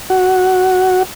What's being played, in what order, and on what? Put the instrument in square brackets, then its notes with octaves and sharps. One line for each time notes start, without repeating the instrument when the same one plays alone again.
[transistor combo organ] F#4